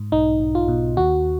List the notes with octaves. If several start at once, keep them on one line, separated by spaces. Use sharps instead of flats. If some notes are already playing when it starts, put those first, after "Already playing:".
Already playing: G#2
B1 D#4
B1
F4
B2
D#2 F#4